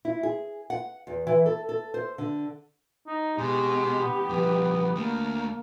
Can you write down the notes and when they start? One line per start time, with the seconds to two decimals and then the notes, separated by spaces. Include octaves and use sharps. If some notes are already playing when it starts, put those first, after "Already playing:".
0.05 E4
0.23 G#4
0.70 F#5
1.07 E2
1.27 E3
1.46 A4
1.69 A4
1.94 C5
2.18 D3
3.07 D#4
3.38 B2 G#3 G4
4.00 B3
4.29 G2 F3 B4
4.96 D2 A3 A#3